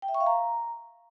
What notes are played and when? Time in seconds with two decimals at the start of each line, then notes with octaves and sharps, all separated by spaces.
0.02 G5
0.08 E5
0.14 C#6
0.20 F5
0.27 A#5